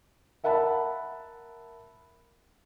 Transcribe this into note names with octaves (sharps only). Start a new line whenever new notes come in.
A#4 E5 F#5 A5 B5